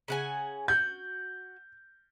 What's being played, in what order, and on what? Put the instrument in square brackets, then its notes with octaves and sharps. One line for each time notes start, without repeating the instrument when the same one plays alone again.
[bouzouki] C#3 F#5 G#5
[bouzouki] F#4 [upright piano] G6